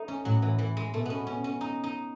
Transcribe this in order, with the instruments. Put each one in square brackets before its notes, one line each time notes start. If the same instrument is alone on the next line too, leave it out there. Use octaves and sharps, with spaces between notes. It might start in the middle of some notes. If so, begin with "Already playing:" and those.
Already playing: [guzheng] A3 D#4
C#4
[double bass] A2 [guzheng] F#3
[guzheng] E3
E3
G#3
[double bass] B2 [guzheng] A3
[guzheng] B3 C#4
C#4
C#4
D#4
D#4